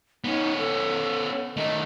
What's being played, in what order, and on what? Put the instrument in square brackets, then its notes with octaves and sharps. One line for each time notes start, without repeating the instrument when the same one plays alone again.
[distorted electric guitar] B3 C#4 [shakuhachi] D#4
[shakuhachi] A4
[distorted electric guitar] D#3 A3 [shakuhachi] D#5